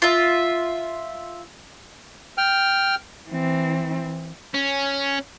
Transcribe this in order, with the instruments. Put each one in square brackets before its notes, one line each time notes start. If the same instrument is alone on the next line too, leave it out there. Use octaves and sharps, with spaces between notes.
[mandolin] F4 E5
[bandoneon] G5 F6
[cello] E3 C4
[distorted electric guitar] C#4